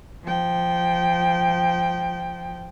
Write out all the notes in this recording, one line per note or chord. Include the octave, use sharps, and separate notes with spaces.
F3 G5